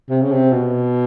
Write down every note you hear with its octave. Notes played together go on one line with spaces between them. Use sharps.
C3
C#3
C3
B2